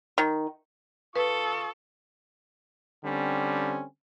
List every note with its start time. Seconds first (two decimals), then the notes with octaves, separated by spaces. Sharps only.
0.18 D#3
1.16 F4 A4 B4 C#6 D#6
3.04 D3 G3 C4 C#4